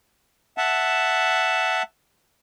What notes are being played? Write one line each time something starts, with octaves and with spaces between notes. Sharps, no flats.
E5 F#5 A5